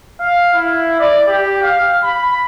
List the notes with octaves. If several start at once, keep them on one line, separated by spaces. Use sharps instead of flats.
F5
E4
D5
G4
F5
B5